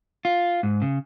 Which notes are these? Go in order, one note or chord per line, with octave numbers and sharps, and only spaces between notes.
F4
G#2
C#3